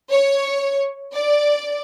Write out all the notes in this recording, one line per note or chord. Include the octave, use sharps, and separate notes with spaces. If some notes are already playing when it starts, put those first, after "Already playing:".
C#5
D5